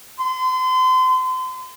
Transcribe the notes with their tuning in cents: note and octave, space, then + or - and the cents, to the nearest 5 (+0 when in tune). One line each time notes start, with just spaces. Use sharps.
C6 -35